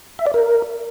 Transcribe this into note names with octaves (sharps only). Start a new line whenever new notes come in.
E5
D5
A#4